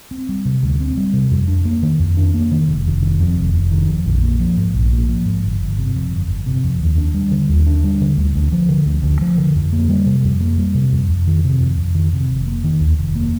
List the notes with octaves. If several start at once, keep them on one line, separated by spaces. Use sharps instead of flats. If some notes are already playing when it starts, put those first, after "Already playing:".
C4
G3
C3
D2
C4
G3
C3
F2
D4
A#3
D#3
F2
D4
A#3
D#3
F1
F1
D#3
F2
F1
F1
D#3
F2
A#1
A#3
F3
G#2
A#1
A#3
F3
G#2
G1
G1
C3
F2
G1
G1
C3
F2
D#2
D4
G3
D3
D#2
D4
G3
D3
D2
D2
F3
D3
D2
D2
F3
D3
F2
A#3
G3
C3
F2
A#3
G3
C3
F2
F2
D#3
C3
F2
F2
D#3
C3
F1
A#3
D#3
D#2
F1
A#3